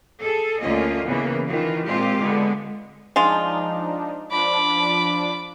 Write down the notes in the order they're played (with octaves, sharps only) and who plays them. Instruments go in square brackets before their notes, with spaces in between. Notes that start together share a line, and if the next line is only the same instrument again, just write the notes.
[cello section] G#4 A4
D2 D3 A#3 C#4 F4 D#5
C#3 E3 A#3 B3
D#3 E3 F4
A#2 G#3 C4 F4 G4
D3 G#3 B3
[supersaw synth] F3 D4 D#4 [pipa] G#3 F4
[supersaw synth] F3 D4 [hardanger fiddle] B5 D6